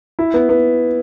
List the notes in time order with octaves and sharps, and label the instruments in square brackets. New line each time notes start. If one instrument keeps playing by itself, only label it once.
[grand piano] E4
B3
B3